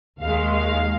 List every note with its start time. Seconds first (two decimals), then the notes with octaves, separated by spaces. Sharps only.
0.21 D#2 D#3 G#3 F5
0.56 F5